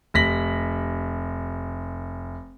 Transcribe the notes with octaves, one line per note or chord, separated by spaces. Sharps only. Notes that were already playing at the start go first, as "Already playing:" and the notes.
F1 A#6 B6 F#7